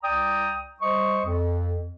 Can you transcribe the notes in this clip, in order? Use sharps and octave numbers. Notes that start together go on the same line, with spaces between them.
C2 D5 G5 A#5 D#6
G3 C5 D#5 C#6
F2